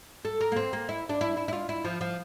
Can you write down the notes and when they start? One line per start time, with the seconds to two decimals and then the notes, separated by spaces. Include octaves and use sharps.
0.25 A4
0.41 A#4
0.52 A#3
0.56 C4
0.73 A#3
0.89 E4
1.09 D4
1.21 E4
1.37 E4
1.48 E4
1.53 F4
1.69 E4
1.84 F3
2.01 F3